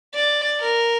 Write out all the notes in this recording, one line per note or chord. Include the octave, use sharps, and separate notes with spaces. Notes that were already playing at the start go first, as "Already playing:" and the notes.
D5
A#4